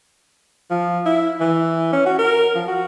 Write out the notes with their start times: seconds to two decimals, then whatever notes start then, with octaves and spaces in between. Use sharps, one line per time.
0.70 F3
1.06 E4
1.40 E3
1.92 C#4
2.06 F#4
2.19 A#4
2.55 F3
2.68 F#4